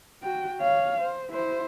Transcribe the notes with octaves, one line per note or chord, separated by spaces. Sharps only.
F#4 G5
C#5 F5
C5
E4 C5